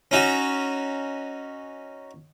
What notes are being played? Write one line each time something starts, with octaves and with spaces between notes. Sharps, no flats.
C#4 D#4 F#4